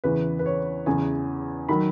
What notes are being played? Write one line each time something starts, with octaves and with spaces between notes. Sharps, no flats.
E2 C#3 E3 B4
B4
C#5
E2 C#3 E3 G#5
D#3 F#3 B5